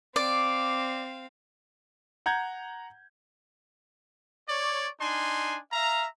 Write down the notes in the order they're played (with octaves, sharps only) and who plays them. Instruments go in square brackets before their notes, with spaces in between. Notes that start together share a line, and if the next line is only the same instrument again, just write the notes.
[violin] C4 F5 [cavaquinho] D5 D6
[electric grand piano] F#5 A#5 G6 G#6
[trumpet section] C#5 D5
D4 D#4 G#5 C6
E5 F5 A#5